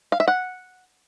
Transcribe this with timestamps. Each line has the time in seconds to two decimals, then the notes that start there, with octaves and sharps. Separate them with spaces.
0.12 F5
0.20 E5
0.28 F#5